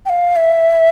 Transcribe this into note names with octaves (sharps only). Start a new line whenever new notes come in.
G5
F5
E5